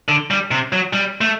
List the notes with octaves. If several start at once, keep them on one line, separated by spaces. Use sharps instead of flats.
D3
G3
C3
F#3
G3
A3